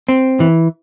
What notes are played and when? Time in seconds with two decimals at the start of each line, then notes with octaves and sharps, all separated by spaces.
0.09 C4
0.40 E3